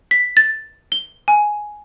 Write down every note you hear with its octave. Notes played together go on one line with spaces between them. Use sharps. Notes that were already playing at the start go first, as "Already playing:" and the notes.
B6
A6
G7
G#5